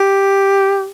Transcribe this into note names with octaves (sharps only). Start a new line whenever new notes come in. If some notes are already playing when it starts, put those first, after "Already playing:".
Already playing: G4